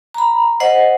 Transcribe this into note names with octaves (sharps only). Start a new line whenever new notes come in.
A#5 B5
C5 D#5 F#5